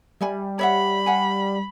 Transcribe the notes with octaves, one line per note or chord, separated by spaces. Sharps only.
G3 E5 G#5 B5
C#5 E5 F#5 B5
F5 F#5 G#5